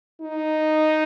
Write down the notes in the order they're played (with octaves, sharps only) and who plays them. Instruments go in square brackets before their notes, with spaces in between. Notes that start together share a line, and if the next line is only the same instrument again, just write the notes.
[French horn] D#4